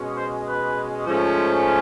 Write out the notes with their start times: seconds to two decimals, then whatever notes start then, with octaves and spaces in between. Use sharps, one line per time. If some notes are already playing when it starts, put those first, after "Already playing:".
Already playing: B2 G#3 C#4
0.16 C5
0.46 B4
1.06 G#2 F3 A3 C#4